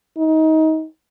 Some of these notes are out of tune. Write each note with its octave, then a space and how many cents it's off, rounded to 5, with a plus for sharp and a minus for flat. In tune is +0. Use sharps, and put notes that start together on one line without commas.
D#4 +25